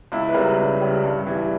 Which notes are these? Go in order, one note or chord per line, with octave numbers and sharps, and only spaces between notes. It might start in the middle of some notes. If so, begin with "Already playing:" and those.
C#2 E4
B4
C#3 G3 A#4
C#2
C#3 G3
G2
E3 G3